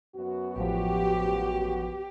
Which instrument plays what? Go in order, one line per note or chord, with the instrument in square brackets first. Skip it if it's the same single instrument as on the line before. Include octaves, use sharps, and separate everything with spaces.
[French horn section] F#2 B3 F#4
[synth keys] A1 F3 [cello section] G4